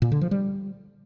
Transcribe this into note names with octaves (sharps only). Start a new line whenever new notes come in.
A#2
D3
F3
G3